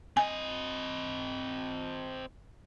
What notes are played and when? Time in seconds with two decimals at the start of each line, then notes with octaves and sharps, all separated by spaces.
0.17 C4 D#5 G#5